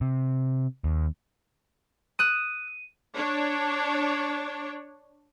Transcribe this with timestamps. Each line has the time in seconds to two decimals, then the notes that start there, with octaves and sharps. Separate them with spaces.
0.01 C3
0.84 D#2
2.19 D#6 E6 F#6 D#7
3.16 D4 C#5